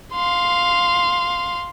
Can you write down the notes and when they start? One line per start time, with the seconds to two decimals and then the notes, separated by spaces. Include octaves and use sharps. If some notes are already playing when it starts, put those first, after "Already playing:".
0.13 F5 C6